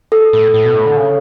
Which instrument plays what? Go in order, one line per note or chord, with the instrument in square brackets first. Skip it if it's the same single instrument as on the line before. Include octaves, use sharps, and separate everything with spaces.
[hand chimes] A4
[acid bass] A2
A2
B2
A2
D3
C#3